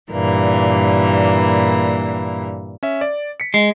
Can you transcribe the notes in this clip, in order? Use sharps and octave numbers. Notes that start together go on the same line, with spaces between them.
G2 A#2 E3 A#3
C#4 E5
D5
B6 C#7
G#3